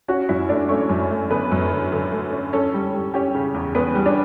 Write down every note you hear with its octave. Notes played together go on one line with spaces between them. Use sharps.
C#4 F#4 F#5
F#2 E4 E5
A3 D4 D5
A3 C#4 C#5
F#2
A3
D3 B3 B4
F#2
D3
D3
A3
C#4
C#4 A4
G3
G3
C#4 G4
C#3
E2
E2 B3 B4
G3
D4 D5